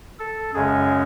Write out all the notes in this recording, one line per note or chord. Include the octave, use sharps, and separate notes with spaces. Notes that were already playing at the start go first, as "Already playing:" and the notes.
A4
F#2 C#3 G#3 C#4 G#4